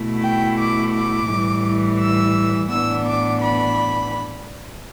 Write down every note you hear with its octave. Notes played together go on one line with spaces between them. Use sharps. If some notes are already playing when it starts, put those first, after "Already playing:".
Already playing: B2 A3 E4
G5
D6
D6
A2 E3 G3
E6
A2 E3 B3 D4 E6
D6
B5